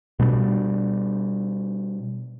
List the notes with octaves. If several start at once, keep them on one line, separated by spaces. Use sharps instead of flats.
B2 G3 A3 D4